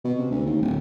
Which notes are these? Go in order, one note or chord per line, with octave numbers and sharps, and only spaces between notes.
B2
C3
D2
D#2
D1